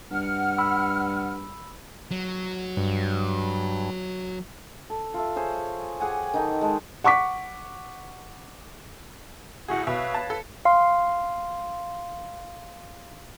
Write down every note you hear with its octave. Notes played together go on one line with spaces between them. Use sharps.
G2 F#5 F6
B5 E6
F#3
G2
A4
F4 A4 E5
G#4 C5 C#5
G4 G#4 F#5 G#5
D#3 D#4 A4
G#3 A5
F#5 C#6 D6 B6
D2 A2 F#4 G#4 F#5
B2 B4 C#5 E5 F5
A5
A4
F5 C6